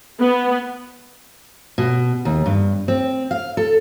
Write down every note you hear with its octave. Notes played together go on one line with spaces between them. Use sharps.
B3
B2
D#2
G2
C4
F5
A4